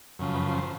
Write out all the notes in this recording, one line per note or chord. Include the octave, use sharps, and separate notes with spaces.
F#2 C#3 F3
B4
C5